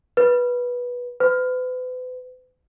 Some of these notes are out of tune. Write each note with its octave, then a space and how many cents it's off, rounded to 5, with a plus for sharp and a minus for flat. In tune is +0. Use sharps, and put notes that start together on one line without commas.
B4 -15
B4 +40